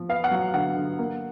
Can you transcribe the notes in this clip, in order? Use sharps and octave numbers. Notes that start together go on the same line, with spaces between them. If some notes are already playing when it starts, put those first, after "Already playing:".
Already playing: F3
B3 F5
F#5
F#3
D3 F#5
D3
A#3